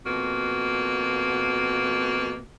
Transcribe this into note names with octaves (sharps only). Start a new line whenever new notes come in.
F2 B2 A#3 F#4